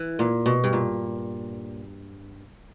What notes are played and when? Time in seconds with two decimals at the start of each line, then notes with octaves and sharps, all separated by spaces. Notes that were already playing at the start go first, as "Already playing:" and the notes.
Already playing: E3
0.19 A#2
0.46 B2
0.64 G2
0.73 A#2